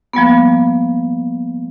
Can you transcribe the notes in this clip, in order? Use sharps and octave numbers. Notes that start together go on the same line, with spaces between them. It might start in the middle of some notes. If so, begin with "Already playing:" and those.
F3 G3 A#3 B3